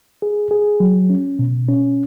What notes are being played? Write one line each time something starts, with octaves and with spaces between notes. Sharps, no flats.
G#4
G#4
F#3
C#4
B2
C#4